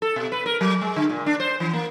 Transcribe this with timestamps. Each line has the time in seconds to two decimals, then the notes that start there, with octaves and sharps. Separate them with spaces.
0.02 A4
0.16 B2
0.32 B4
0.46 A#4
0.61 F#3
0.81 G#3
0.96 D3
1.10 A#2
1.26 D4
1.40 C5
1.60 E3
1.73 A#3